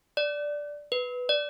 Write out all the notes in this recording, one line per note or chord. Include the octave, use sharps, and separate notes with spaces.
D5
B4
D5